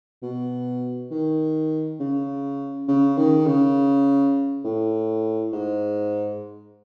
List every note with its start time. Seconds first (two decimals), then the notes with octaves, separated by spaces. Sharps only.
0.23 B2
1.11 D#3
2.00 C#3
2.88 C#3
3.17 D#3
3.47 C#3
4.65 A2
5.53 G#2